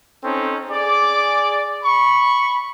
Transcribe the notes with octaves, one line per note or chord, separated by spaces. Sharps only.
C4 C#4 D#4 A4
G#4 D5 D6
B5 C#6